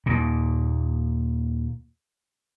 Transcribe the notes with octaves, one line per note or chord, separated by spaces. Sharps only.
D#2 A#2